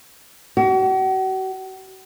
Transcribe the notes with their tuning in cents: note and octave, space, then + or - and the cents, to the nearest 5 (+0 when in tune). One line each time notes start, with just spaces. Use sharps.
F#4 +40